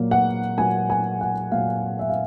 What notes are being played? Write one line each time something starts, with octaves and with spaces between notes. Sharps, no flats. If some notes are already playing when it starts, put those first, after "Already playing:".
Already playing: A#2 F#3 A#3
F#5
A#2 F#3 A#3 G#5
G#5
F#5
A#2 F#3 A#3 F5
E5
F5